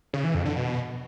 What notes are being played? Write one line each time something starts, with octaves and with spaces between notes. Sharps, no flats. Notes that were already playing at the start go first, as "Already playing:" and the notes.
C#3
E3
F2
D3
B2